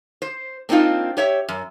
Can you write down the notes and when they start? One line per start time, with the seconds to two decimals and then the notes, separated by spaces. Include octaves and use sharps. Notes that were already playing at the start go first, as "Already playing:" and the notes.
0.22 C5
0.69 A#3 C4 D4 D#4 F4
1.17 G4 C#5 E5
1.49 F#2